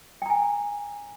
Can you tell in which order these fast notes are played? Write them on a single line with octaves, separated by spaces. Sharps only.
G5 A#5 G#5